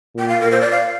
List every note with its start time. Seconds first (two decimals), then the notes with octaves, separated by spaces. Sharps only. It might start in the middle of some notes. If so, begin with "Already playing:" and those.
0.15 A#2 G5
0.29 F5
0.41 A#2 A#4
0.51 C5
0.61 D5
0.71 F5